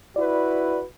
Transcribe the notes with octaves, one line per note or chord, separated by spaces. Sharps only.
E4 F#4 B4 D5